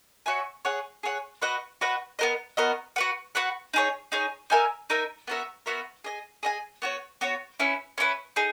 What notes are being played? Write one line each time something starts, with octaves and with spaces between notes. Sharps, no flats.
F#4 C#5 E5 G#5
G#4 C#5 F#5
G#4 C#5 F#5
F#4 B4 D#5 F#5
F#4 B4 D#5 F#5
B3 F#4 A#4 D#5
B3 F#4 A#4 D#5
F#4 B4 F#5
F#4 B4 F#5
D#4 G#4 C#5
D#4 G#4 C#5
D#4 A#4 E5 G#5
D#4 A#4 E5 G#5
B3 F#4 A#4 E5
B3 F#4 A#4 E5
G#4 D#5 G#5
G#4 D#5 G#5
B3 F#4 C#5
B3 F#4 C#5
C#4 E4 B4
C#4 E4 B4
D#4 G#4